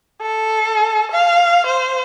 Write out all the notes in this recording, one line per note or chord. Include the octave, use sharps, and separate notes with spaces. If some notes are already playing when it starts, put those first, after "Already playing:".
A4
F5
C5